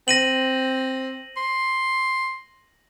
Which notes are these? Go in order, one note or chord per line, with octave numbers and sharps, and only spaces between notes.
C4 A#6 D#7 F#7
C6